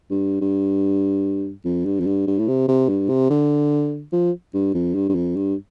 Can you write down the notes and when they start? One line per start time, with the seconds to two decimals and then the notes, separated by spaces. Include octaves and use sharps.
0.10 G2
0.41 G2
1.65 F2
1.85 G2
2.00 F2
2.07 G2
2.27 G2
2.39 A2
2.48 C3
2.68 C3
2.88 G2
3.09 C3
3.30 D3
4.12 F3
4.54 G2
4.74 F2
4.95 G2
5.09 G2
5.15 F2
5.36 G2